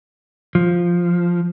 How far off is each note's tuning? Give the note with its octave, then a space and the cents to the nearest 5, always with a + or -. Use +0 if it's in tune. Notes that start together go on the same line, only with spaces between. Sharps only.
F3 +0